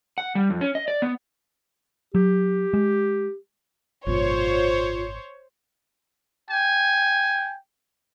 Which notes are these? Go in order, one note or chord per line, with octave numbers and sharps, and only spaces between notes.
F#5
G3
F2
C#4
D#5
D5
B3
F#3 G4
G#3
G#1 F#2 B2 F4 C5 C#5
G5 G#5